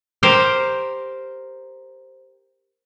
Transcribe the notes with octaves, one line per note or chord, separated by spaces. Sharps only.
G4 A#4 C5